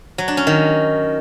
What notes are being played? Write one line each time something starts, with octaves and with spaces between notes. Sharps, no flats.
F#3
D4
C#4
D#3